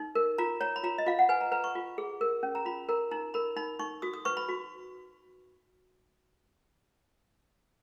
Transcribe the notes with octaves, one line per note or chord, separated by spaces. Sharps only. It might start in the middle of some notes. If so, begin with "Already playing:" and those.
Already playing: D#4
A#4
F4 A#5
C#5 A#5
B5
F4 A#5
D#5
F4 F5
F#5
B4 G#5
A#5
B4 A#5
C#6
F4
G#4
A#4
C#4
A#5
F4 B5
A#4 A#5
D#4 A#5
A#4 B5
D#4 B5
D#4 C#6
F#4 D#6
D#6
B4 C#6
B5
F#4